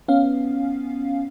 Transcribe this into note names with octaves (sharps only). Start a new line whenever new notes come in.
B3 C#4 F5